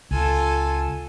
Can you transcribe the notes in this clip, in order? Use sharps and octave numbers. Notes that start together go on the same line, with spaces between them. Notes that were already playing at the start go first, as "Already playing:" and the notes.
C#2 F4 A4 G#5